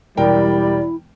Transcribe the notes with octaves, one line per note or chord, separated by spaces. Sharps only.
E1 G3 E4 A#4 D5 G5